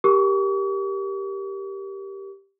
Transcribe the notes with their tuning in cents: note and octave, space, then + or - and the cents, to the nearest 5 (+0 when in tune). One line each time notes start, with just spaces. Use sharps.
G4 +0 A#4 +0 C#6 +45